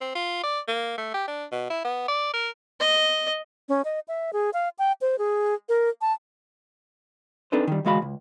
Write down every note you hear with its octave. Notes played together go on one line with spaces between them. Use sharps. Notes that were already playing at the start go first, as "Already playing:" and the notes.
C4
F4
D5
A#3
A3
G4
D4
B2
E4
B3
D5
A#4
D#5
C#4
D#5
E5
G#4
F5
G5
C5
G#4
A#4
A5
C4 D4 D#4 A4 B4 C5
D#3 G3
D2 E3 G#3 F#4 F5 B5
C#2